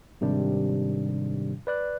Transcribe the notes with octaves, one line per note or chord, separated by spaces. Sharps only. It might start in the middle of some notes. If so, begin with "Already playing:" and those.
G#2 C3 D#3 G3 D4
B4 D5 F#6